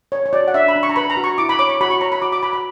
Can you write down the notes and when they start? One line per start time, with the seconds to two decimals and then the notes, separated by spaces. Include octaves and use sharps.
0.12 C#5
0.26 C#5
0.33 F#4 D5
0.48 F#5
0.54 D4 E5
0.68 B5
0.76 D4
0.83 C#6
0.90 A#5
0.96 B4 B5
1.10 A#5
1.17 F#4
1.24 C#6
1.38 E4 D6
1.49 B5
1.59 C#5 D6
1.69 C#6
1.81 F#4 B5
1.90 C#6
2.01 C#5 A#5
2.12 B5
2.22 F#4 D6
2.32 D6
2.43 F#4 B5
2.53 B5